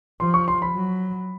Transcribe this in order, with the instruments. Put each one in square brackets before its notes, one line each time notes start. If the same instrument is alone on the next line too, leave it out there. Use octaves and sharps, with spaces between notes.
[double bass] F3 [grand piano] C6
[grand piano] C#6
C6
B5
[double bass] F#3